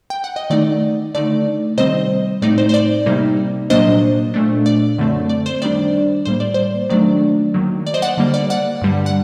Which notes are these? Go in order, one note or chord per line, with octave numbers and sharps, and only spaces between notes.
G5
F#5
D#5
D#3 A3 D#4 D5
D3 A3 D#4 D5
C3 D#3 G3 C4 C5 D#5
A2 A3 C4 D#4 D5
C5
C5
D5
C3 G3 A#3 D#4
A#2 F#3 A#3 D4 C5 D#5
A#2 A3 D4
D5
F#2 D3 A3 C4
D5
C5
D#3 G3 D4 D5
A2 G3 A#3 C5
D5
C5
D#3 F#3 A3 D4 D5
D#3 F#3 A#3
D5
C5 D#5
D5 F#5
D3 G3 A#3
D5
D5 F#5
G2 D3 G3
F#5